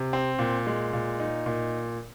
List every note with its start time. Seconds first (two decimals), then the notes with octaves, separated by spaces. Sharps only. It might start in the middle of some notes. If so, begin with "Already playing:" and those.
Already playing: C3
0.13 C4
0.39 A#2
0.67 G#3
0.93 A#2
1.20 D#4
1.46 A#2